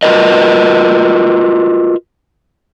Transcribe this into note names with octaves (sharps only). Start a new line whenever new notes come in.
F4 F#4 G#4 A#4 B4 D#5